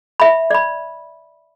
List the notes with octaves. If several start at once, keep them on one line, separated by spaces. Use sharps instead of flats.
E5 B5
D5 B5